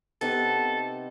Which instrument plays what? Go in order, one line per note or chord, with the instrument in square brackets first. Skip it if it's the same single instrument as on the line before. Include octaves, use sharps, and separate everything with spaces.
[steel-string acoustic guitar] C3 B3 D#4 [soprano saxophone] A4